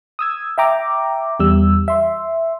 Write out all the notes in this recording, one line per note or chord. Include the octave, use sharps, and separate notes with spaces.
D#6 E6 G#6
E5 G5 A#5 D6
E2 G3 E6
E5 C6